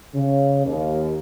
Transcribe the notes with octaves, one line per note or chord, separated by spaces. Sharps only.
C#3
D#2